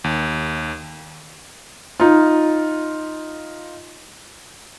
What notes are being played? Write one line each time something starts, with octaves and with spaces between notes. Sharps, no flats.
D#2
D#4 F4